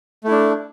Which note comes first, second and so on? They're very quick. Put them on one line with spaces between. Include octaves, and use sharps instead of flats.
A3 E4 D4